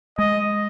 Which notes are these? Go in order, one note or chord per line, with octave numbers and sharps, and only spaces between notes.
G#3 D#5